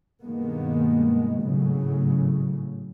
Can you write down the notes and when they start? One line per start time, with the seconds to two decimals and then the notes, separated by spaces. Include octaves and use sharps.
0.23 G2 B2 D#3 G#3 A#3 B3
1.41 G#1 A2 C#3 F#3